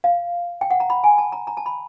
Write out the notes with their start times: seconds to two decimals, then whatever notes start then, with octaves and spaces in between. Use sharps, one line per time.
0.04 F5
0.61 G5
0.71 F#5
0.80 A#5
0.90 B5
1.04 G#5
1.18 A5
1.32 A#5
1.47 A#5
1.57 A5
1.66 B5